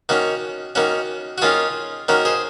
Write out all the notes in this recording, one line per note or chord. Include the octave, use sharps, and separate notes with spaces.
D#3 A#3 C#4 F#4
D#3 A#3 C#4 F#4
F#4
D#3 A#3 C#4 F4 G#4
D#3 A#3 C#4 F#4 A#4
G#4 C5